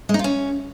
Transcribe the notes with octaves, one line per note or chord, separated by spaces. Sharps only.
G#3
D#4
F4
C#4